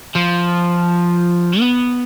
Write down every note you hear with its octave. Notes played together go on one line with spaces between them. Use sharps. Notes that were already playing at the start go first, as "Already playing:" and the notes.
F3
B3